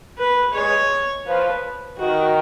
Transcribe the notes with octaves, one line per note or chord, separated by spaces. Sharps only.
B4
G#3 C#5
F3 B4
D#3 F#4